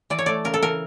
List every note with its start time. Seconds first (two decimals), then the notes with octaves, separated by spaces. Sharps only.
0.10 E3 D5
0.19 C#5
0.26 A3 D5
0.45 C#3 A#4
0.54 A4
0.63 E3 A#4